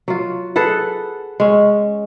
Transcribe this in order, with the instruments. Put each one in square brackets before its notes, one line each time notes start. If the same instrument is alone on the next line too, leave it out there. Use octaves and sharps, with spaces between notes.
[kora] F#3 F4
G#4 A4 B4 F#5
G#3 C#4